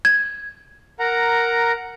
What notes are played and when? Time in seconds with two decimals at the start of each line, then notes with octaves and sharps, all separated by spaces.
0.05 G#6
1.00 A#4 F#5 A#5